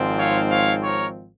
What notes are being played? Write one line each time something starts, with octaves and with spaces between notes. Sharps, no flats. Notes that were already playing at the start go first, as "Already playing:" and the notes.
Already playing: G#1 G#2 F3 C4
C#5 F5
C#5 F5
A#4 C#5